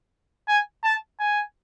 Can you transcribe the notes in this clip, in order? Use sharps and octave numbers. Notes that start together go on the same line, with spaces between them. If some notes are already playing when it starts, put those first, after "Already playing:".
G#5
A5
G#5